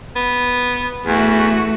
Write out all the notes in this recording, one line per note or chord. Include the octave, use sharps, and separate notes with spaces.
B3
E2 A3 F#4